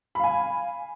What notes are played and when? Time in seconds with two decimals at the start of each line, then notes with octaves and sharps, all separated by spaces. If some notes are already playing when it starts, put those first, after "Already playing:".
0.15 B5
0.19 F5
0.24 G#5